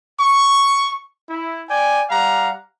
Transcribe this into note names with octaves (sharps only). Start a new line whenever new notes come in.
C#6
E4
D5 G5 G#5
G3 F5 F#5 A#5